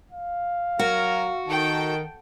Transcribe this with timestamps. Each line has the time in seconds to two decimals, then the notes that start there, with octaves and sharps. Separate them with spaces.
0.11 F5
0.79 F#3 F#4 A#4
1.48 D#3 A4 G5